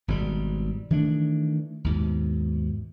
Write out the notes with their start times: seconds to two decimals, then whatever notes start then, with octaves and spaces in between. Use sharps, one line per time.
0.08 G#1 B2 G3
0.90 D#3 E3 A3 D4
1.84 D#2 G#2 B2